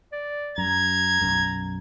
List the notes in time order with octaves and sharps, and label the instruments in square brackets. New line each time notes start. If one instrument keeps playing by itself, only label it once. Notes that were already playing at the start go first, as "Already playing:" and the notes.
[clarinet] D5
[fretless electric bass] F#2 [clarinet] A#5 [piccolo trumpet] G#6
[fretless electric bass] B1 F#2